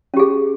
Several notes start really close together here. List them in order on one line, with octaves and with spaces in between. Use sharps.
C#4 G4 G#4